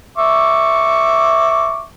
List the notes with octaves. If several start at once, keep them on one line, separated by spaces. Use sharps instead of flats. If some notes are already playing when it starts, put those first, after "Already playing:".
E5 C#6 D6